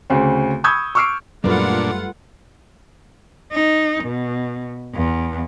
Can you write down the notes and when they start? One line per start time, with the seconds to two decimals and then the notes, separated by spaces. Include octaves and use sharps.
0.10 D2 C#3 C4
0.64 B5 C#6 D#6 E6 G6 G#6
0.95 C#6 D6 E6 F6 C7 D7
1.44 F#2 A#2 G3 A3 D4 F4 B4 F#5
3.52 D#4
4.04 B2
4.95 E2